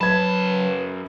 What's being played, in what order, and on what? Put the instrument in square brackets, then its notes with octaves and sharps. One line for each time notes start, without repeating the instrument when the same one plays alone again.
[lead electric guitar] F#2 A5 [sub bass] F#3 [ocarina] B4 [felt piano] B5 G#6